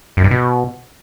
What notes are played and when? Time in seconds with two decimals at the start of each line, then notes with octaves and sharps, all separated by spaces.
0.17 F#2
0.24 G2
0.31 B2